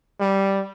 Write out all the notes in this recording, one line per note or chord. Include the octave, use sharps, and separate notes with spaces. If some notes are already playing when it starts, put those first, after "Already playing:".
G3